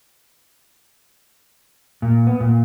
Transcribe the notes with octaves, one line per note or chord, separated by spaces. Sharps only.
A#2
B3
A#2